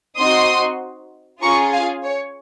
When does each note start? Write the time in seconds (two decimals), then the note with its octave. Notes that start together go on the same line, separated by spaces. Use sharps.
0.17 C4 D#4 F#4 C6 D#6
1.41 C#4 F4 G#4 A#5 C#6
1.73 F5 G#5
2.04 C#5